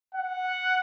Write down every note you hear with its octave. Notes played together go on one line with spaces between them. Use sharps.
F#5